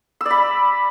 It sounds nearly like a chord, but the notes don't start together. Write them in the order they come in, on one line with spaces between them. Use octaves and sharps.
E6 D5 B5